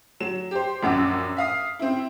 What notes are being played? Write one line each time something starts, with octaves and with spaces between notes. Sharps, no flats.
F#3 E7
G4 C5
A#1 F#2 F#5 D6 E6
E5 F5 D#6
C4 E4